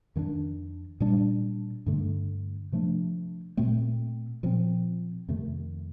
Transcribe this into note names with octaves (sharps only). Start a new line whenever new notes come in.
F2 D#3 A#3 D4
A#2 G3 D4
G2 D3 A3
C3 F3 A3 D4
A#2 A3 C4
A#2 F3 C4
F2 C3 D#3 A3